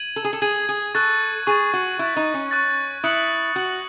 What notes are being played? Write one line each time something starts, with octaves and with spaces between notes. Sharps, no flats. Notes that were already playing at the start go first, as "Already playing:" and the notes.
Already playing: G#6 D#7 F#7
A4
G#4
A4
G#4 G#6 D#7 F#7
G#4
A4 C#6 F#6 A6
G#4 C#6 F#6 A6
F#4
E4 C#6 F#6 A6
D#4
C#4
C#6 F#6 A6
E4 D#6 F#6 C#7 F#7
F#4 D#6 F#6 C#7 F#7